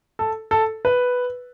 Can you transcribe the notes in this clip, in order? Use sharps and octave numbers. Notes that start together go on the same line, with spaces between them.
A4
A4
B4